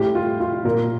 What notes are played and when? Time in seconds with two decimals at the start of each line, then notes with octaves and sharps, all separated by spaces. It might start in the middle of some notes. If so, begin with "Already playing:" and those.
Already playing: A2 G4
0.15 F4
0.40 F4
0.65 A#2 A#4